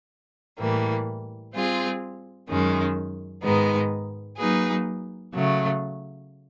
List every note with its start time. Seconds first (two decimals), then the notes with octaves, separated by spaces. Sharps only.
0.58 A2 E3 G3 A#3
1.53 G3 C4 F4 G#4
2.49 F#2 D#3 G#3 C#4
3.43 G#2 D#3 G#3 B3 D#4
4.38 F#3 A#3 D#4 G#4 B4
5.34 C#3 F#3 A3